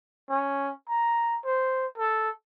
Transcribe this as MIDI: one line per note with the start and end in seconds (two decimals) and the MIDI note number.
0.29 0.71 61
0.89 1.38 82
1.45 1.86 72
1.98 2.30 69